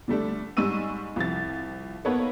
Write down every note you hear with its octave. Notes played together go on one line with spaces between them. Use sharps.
D3 G3 A3 D4
G#2 G3 G#3 C#6 E6 D#7
C2 F3 A6
A#3 B3 D#4 A4 B4 C#5